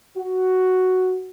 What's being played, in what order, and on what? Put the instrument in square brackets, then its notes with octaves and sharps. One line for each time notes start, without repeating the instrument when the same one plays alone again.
[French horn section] F#4